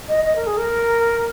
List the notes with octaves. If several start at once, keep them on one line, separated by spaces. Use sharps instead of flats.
D#5
D#5
A#4
G#4
A#4